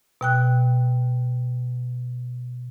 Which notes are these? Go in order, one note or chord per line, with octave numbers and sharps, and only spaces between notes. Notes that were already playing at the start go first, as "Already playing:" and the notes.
B2 G5 F#6